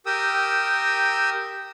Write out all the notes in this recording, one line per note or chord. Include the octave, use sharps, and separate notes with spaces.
G4 A#4 G5 D#6 E6